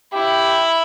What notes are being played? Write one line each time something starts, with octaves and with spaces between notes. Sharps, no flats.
E4 G4